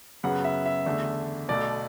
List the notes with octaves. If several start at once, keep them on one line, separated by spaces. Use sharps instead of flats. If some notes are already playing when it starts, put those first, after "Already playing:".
F#2 C#3 F#3 B3 F#5
E5
E5
E2 D3 A3
B1 B2 A3 D5